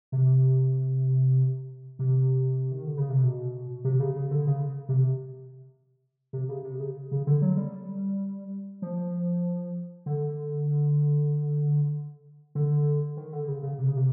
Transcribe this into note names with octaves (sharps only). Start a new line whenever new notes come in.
C3
C3
D#3
D3
C#3
C3
B2
C3
C#3
C#3
D3
C#3
C3
C3
C#3
C3
C#3
C#3
D3
F#3
G3
F3
D3
D3
D#3
D3
C#3
C#3
C3
C#3
C3